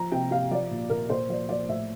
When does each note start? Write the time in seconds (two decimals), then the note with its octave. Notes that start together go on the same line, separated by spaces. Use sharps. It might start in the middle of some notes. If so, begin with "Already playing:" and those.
Already playing: F3 A#5
0.12 C3 G5
0.31 C3 F5
0.51 F3 D5
0.71 A#2
0.90 A#2 A#4
1.10 A#2 C5
1.29 F3 D5
1.49 F3 D5
1.68 A2 E5